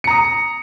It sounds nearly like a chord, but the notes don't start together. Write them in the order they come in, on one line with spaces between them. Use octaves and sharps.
C#7 A#5 D#6